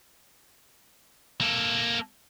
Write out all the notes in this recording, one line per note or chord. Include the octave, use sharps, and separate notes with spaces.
A#3 A4